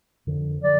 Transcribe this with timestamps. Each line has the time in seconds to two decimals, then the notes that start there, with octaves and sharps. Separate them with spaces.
0.27 F2 D3 F3
0.64 D3 F3 D5